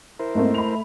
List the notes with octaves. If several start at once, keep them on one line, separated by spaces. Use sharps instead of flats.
E4 A#4 C5
G#2 A3 A#3 C4
B5 F7